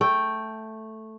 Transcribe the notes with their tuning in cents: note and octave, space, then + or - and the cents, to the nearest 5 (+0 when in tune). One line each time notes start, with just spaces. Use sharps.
A3 +0 G5 +0